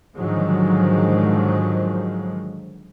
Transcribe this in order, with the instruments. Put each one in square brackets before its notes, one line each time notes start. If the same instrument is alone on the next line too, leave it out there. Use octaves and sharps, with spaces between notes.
[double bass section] G#2 D3 D#3 F3 F#3 G#3